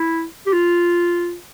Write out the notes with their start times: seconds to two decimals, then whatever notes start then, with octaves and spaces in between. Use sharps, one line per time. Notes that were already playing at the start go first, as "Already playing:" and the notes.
Already playing: E4
0.47 G4
0.53 F4